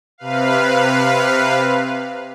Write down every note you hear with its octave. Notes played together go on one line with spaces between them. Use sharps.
C3 B4 F5